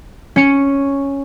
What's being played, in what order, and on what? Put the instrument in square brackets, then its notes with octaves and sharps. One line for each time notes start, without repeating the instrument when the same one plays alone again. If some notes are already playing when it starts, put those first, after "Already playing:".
[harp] C#4 C#7